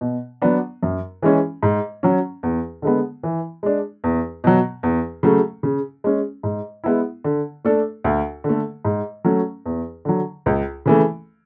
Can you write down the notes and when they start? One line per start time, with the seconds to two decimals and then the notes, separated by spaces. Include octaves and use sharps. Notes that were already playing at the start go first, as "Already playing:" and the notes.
0.01 B2
0.42 F#3 B3 D4
0.83 F#2
1.22 E3 G#3 C#4
1.63 G#2
2.03 F#3 C#4
2.43 E2
2.82 D3 G#3 B3
3.23 E3
3.63 G#3 D4
4.04 E2
4.44 B2 F#3
4.83 E2
5.23 C#3 F#3 A3
5.63 C#3
6.04 G#3 C#4
6.43 G#2
6.84 G#3 B3 E4
7.24 D3
7.65 A3 D4 A4
8.04 D2
8.44 D3 A3
8.85 G#2
9.24 F#3 A3 C#4
9.66 E2
10.05 D3 F#3
10.46 C#2
10.86 C#3 E3 A3